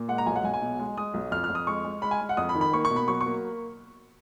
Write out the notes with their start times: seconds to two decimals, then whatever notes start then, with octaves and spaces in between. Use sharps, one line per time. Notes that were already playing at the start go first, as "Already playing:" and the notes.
Already playing: A#2
0.08 G#3 F#5
0.18 A#5
0.26 B1 G#5
0.36 F#5
0.43 B1 G#5
0.53 G#5
0.62 B2
0.79 G#3
0.97 G#3 D#6
1.14 B1
1.32 F2 F6
1.44 F6
1.49 F2
1.55 D#6
1.67 G#3 C#6
1.84 G#3
2.02 G#3 B5
2.11 G#5
2.21 G#3
2.29 F#5
2.37 F2 D#6
2.49 B5
2.55 D#3
2.61 B5
2.73 A#3 C#6
2.85 C#6
2.90 B2
2.96 B5
3.08 F#3 C#6
3.21 C#6
3.26 A#3